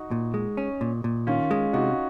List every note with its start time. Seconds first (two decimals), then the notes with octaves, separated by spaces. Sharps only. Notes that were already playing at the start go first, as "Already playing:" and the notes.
Already playing: D#4 F#4
0.11 A#2
0.34 G#3
0.57 C#4
0.81 A#2
1.04 A#2
1.27 D#3 C#4 F4
1.51 G#3
1.73 C3 D#4 F#4